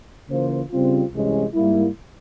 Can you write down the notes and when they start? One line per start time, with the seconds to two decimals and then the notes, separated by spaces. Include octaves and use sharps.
0.29 C#3 E3 A#3 F4 C5
0.71 C#3 G3 C4 F4
1.11 C2 C3 E3 G#3 C#4
1.54 G#2 G3 A#3 E4